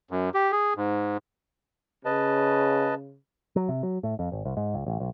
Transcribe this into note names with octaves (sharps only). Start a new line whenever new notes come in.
F#2
G4
G#4
G#2
C#3 B4 D#5 A5
F#3
C3
F#3
A2
F2
G#1
C2
G#2
C#2
A1
B1